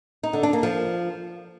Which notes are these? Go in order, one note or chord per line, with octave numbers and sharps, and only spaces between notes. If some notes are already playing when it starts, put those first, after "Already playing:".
D#4
D3
D4
A#3
F3